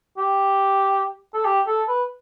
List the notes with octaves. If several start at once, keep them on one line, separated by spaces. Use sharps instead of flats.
G4
A4
G4
A4
B4